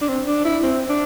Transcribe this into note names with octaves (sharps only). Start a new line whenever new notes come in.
D4
C4
D4
E4
C4
D4